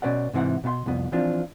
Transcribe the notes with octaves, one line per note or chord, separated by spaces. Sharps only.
B2 C#4 B4 D5 F#5
G#2 C3 E3 F5 F#5
B2 B3 F5 C6
C2 F2 B3
E3 F3 C4 D4 F4